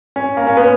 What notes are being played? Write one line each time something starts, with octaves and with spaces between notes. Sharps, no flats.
C#4
A#3
C#4
B3